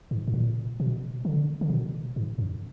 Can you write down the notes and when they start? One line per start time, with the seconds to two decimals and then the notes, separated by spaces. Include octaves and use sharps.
0.11 G#2
0.28 G#2
0.34 A#2
0.80 B2
1.25 D3
1.61 D3
1.70 B2
2.16 G#2
2.38 F#2